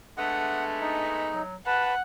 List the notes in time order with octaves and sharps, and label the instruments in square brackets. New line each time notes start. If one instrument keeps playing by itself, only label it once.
[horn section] G#3 A3 B3 [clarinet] D4 [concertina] F#5
[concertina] D#4
[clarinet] F#3
[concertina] B4 [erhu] F#5 [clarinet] A5